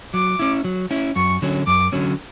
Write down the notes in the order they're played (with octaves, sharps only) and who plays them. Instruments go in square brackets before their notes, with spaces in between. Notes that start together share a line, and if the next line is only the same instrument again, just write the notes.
[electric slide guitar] F#3 [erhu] D6
[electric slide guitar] C#4 E4
F#3
C#4 E4
[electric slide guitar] F#2 [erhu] C#6
[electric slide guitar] D3 F#3 C#4
[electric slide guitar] F#2 [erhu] D6
[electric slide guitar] D3 F#3 C#4